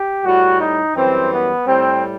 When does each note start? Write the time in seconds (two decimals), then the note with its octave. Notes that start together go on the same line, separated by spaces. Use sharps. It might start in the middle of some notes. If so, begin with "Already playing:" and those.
Already playing: G4
0.24 A2 G3 F#4
0.59 D#4
0.95 F#2 E3 G3 C4
1.31 B3
1.67 A2 G3 C4